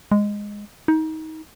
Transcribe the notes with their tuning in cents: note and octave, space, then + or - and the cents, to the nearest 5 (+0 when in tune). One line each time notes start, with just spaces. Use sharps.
G#3 -10
D#4 +25